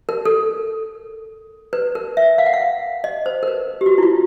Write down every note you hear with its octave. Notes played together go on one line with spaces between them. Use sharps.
A#4
A4
B4
A#4
E5
F5
F#5
F5
D#5
C5
A#4
B4
G4
F#4
E4
F4